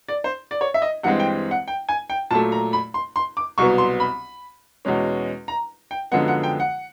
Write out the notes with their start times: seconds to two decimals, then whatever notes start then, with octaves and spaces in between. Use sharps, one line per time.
0.08 D5
0.24 C5
0.51 D5
0.61 C#5
0.74 E5
0.82 D#5
1.03 G2 E3 G#3 C4 F#5
1.20 G5
1.51 F#5
1.68 G5
1.89 G#5
2.10 G5
2.31 A#2 F#3 A3 A5
2.52 A#5
2.73 B5
2.94 C6
3.16 C6
3.37 D6
3.58 C2 B2 F#3 B3 C#6
3.78 C6
4.00 B5
4.85 E2 B2 G#3 C#4
5.48 A#5
5.91 G5
6.11 F#2 D3 F3 G#3 B3 F#5
6.28 F#5
6.43 G5
6.60 F#5